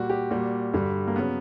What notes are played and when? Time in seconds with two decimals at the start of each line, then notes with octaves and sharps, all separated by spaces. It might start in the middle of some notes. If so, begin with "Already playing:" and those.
Already playing: A#2 G3 F#4
0.10 G4
0.31 A#2 G3 F#4
0.74 G2 D3 G3
1.07 A#3
1.16 C#3 F#3 B3